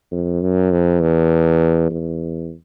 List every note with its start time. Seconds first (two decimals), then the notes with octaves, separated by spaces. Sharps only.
0.11 F2
0.41 F#2
0.71 F2
1.01 E2
1.90 E2